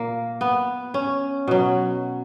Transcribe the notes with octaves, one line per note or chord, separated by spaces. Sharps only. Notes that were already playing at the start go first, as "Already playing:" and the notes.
Already playing: A#2 A#3
B3
C#4
B2 F#3